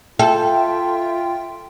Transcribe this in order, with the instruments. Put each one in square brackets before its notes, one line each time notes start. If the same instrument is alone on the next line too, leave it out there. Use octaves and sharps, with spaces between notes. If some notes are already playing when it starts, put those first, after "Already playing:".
[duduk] F4 [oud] A4 [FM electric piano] E5 G5